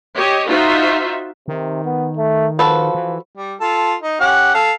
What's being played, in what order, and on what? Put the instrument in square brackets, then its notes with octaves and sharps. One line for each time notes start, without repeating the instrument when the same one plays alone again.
[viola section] G4 C#5 D#5
D#4 F4 F#4 C5 E5
[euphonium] C3 [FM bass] D#3
[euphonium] B3
A3
[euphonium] F3 [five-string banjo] F#4 A4 B4
[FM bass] E3
[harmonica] G3
F4 A4
D#4
C#4 G4 F#5
A4 F5